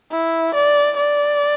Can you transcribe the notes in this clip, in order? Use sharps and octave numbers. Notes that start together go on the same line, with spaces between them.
E4
D5
D5